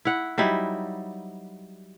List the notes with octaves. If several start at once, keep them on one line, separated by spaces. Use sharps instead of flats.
E4 F#5
F#3 G3 D#4 E4